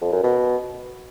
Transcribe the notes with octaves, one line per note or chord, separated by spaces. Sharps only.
F2
F#2
B2